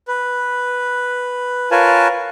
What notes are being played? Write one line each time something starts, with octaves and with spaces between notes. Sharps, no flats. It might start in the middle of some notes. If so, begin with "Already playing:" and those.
B4
F4 A#4 B4 C#5 G#5 A5